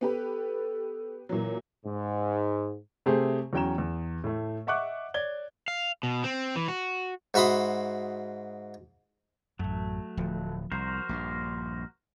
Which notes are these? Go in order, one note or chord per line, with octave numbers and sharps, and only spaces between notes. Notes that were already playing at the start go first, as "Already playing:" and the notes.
B3 G4 A4 B4
A#2 E3 F#3
G#2
C3 A3 G4 G#4 C5
E2 F#3 C#4 G5 A#5 E7
E2
A2 A3
D#5 E5 F#5 C#6 D6 F#6
C#5 D5 G#6 G7
F5
B2
C4
E3
F#4
G#2 F#4 E5 B5 C6 D#6
A1 F#2 F#3 A3
D1 F3
C2 F#4 A#4 C5
A#1 G2